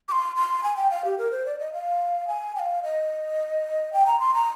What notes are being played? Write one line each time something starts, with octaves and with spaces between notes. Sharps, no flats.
D6
C6
C6
G#5
G5
F5
G4
A#4
C5
D5
D#5
F5
G#5
G5
F5
D#5
G5
A#5
C6
A#5